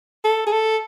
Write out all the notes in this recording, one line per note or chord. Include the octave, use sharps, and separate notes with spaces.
A4
G#4
A4